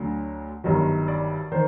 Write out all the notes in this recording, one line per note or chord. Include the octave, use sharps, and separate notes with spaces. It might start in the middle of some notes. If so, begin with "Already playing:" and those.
Already playing: D2 D3 F#3
G1 G2 D#3 F#3
D5
D#3 C5